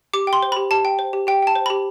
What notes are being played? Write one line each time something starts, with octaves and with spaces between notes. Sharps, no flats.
G4 D6
G5
C6
C5
B5
G4
G4 A5
G5
C5
G4
G4 G5
G5 A5
C5
B5
G4